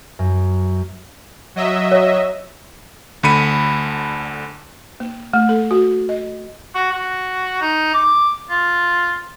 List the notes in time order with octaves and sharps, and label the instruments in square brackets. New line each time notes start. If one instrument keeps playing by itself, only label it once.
[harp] F#2
[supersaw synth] F#3 D#5 E5
[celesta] C#5
[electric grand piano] D2 D3 B5 C#7 D#7
[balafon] A#3
A3
A4
F#4
D#5
[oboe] F#4
F#4
D#4
D6
F4